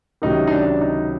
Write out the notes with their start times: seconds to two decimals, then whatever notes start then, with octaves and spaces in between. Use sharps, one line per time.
0.22 C#2 C3 D#3 F#3 D#4
0.47 D#4
0.51 D4
0.81 D#4